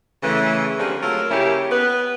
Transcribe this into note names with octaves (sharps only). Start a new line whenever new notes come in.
C#3 E3 A3
D3 F3 G3 A#3 C4 G#4
F#3 A3 F4 A4 A#4
C#3 A#3 C#4 E4 G4
B3 B4